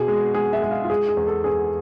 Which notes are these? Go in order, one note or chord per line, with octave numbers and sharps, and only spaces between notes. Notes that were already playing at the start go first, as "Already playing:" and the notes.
Already playing: B2 G#4
G#3
G#3 G#4
E5
G#3
F5
F4
G#3 G#4
G#4
E2
A4
E2 G#4